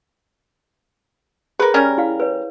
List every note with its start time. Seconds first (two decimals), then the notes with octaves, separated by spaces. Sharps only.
1.60 G#4 A#4 B4
1.74 G3 C#4 A#4
1.98 E4 F5
2.20 B4 C#5